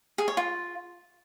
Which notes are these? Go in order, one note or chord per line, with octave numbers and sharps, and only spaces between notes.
G#4
C#5
F4